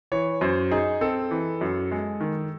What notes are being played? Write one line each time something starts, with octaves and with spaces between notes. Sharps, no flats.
E3 C#5
F#2 C5
D#4 G#4
C4 A4
E3
F#2
G#3
D#3